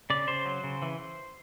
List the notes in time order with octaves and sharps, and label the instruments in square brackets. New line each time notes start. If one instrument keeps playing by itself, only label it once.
[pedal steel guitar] C#3 D5
C#3 C5
F#3
C#3
E3